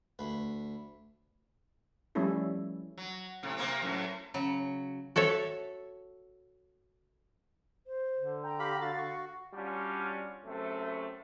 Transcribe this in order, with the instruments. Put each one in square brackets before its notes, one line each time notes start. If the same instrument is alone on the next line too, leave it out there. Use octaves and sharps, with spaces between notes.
[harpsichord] D2 B4
[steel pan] F3 G3 A3 C#4 E4 A4
[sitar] F#3
A2 C3
C3 A#3 C4
F#2 A2
[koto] C#3 F#3
F#4 A4 C#5 E5
[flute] C5
[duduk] D3
[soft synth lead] G5 [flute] A#5
[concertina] G4 F5 B5
[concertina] F#4 [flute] F5 [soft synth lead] A6
[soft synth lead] C#6
[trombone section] G3 C#4 D4 F4 F#4
F#2 C3 A3